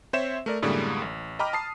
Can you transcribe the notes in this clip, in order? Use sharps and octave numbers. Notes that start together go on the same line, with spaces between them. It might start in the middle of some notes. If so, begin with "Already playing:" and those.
C4 C5 C#5 E5 E7
A3 A#4 D5
F#2 A2 D3 G3 G#3 A#3
A1
D#5 G5 A#5 B5 D6 F6
A5 D#6 C7